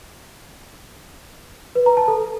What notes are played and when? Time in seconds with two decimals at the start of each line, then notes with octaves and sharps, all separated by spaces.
1.75 B4
1.86 A#5
1.97 A5
2.08 A4